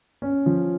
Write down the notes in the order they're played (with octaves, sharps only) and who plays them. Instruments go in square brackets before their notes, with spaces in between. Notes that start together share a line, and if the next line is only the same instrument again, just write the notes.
[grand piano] C#4
F3